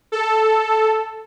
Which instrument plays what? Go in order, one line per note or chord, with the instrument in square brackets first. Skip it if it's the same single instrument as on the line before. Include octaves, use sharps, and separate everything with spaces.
[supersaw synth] A4